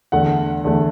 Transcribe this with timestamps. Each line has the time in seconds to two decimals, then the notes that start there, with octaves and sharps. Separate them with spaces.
0.12 E2 D3 A3 F#5
0.64 E2 D3 A3